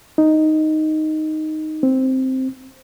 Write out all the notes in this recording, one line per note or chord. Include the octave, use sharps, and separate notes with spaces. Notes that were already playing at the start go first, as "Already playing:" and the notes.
D#4
C4